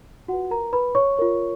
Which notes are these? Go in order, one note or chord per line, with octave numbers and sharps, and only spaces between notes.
F4 F#4 B4 F#5
A#4 A#5
B4 B5
C#5 C#6
F4 A#4 C#5